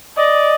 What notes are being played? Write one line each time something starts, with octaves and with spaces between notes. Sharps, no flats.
D5 D#5